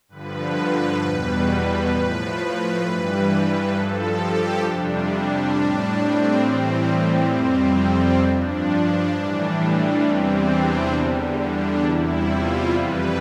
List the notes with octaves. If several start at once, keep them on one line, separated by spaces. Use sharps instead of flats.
G2 D3 F3 B4
E2 B2 G3
A2 F3 B4
G2 E3 G3
G2 F3 A4
G4
F2 C3 G3 D4
D4
A2 G3 D4
C4
A2 E3 G3
F2 C3 G3 C4
C4
G2 F3 D4
A2 E3 G3
E2 C3 E3 G3 C4
D4
E2 D3 G3
D4
E2 C3 G3 E4
F4
F2 C3 E3 G3 B4